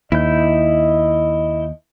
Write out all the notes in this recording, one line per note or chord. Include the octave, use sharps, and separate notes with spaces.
D#2 E4 D#5 G6